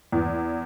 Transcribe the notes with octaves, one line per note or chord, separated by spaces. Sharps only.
E2